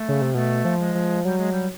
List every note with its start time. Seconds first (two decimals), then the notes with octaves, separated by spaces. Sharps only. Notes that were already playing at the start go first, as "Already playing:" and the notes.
Already playing: A3
0.08 C#3
0.22 C3
0.34 B2 A3
0.65 F3
0.79 G#3
0.95 F3
1.25 F#3 G3
1.38 G#3
1.52 G3